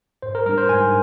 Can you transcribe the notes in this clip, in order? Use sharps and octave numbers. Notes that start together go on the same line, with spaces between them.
G#2 C5
A#4
G3 D4 A#4
C5
G#2 G#5